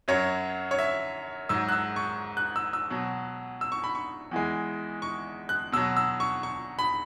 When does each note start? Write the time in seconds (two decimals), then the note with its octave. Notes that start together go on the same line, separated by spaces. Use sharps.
0.08 F#2 F#3 C#5
0.71 C#5
0.79 E5
1.49 G#2 F#3 E6
1.68 F#6
1.72 E6
1.96 C#6
2.37 F#6
2.56 E6
2.73 E6
2.90 B2 F#3
3.61 E6
3.72 C#6
3.84 B5
3.95 C#6
4.31 E2 E3 G#3
5.02 C#6
5.49 F#6
5.72 B2 E6
5.76 F#3
5.97 E6
6.20 C#6
6.43 C#6
6.79 B5